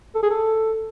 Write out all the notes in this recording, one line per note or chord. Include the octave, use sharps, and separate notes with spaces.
A4
G#4
A4